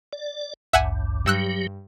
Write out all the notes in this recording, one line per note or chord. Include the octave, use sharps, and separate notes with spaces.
D5
A1 D2 G2 E5 F#5 G#5
G2 F#3 G4 E6 F#6